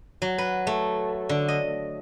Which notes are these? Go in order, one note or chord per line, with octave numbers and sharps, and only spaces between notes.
F#3
B4
A3
D3
D#5